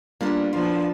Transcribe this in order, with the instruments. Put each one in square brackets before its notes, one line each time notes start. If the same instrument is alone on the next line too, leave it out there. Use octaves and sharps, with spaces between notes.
[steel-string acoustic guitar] G3 B3 D5 [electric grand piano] A#3 D4 F4
[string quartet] F3 B3 A5 [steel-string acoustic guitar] A#3 E4 C5 [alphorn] D4 [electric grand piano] F4